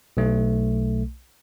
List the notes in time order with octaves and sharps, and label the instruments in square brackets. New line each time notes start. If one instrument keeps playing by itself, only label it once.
[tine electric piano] B1 A3